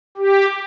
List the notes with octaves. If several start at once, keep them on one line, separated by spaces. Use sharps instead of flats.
G4